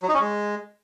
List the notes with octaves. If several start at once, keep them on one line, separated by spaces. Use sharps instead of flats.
F#3
D#4
C#4
G#3